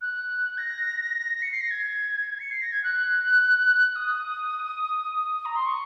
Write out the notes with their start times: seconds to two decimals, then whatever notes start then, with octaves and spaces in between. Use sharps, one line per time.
0.01 F#6
0.58 A#6
1.42 C#7
1.52 C7
1.61 A#6
1.71 G#6
2.40 C#7
2.51 C7
2.62 A#6
2.72 G#6
2.84 F#6
3.96 D#6
5.45 A#5
5.56 C6
5.66 C#6